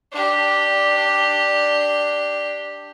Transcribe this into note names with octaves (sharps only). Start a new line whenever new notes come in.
D4 G4